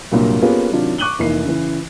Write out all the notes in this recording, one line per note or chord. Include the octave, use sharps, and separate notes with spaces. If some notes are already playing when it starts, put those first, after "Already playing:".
C2 G2 A#2 F#3 A#3
A#3 B3 C#4 F4 G4 G#4
C3 D#3 F#3 D4 F4
C#6 D6 F#6 D#7 F#7 G7
F1 E3 A#3 D#4 C7
C#3 E3